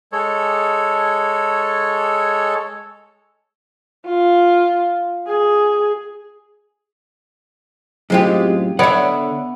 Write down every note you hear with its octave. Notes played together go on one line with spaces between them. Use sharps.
G#3 A4 C#5
F4
G#4
F#2 A2 G#3 C4 F4 G4
D3 B3 C#5 D5 E5 F#5